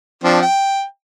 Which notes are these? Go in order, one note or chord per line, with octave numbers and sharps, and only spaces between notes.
F3 C4 D4
G5